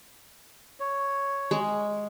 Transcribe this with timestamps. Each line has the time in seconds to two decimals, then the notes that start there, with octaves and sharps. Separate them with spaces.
0.80 C#5
1.51 G#3